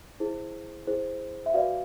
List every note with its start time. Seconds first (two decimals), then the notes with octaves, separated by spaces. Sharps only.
0.20 E4 G#4 C5
0.87 E4 G#4 C5
1.46 E5
1.54 F#4 B4 D5 F5